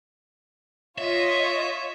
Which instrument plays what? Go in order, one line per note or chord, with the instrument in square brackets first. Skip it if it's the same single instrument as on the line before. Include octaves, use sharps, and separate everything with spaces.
[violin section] F4 D#5 [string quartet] C#5 [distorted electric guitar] E5